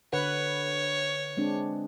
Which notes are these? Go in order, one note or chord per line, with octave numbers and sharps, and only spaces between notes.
D3 B4 C#5 F#5
G#3 C4 D4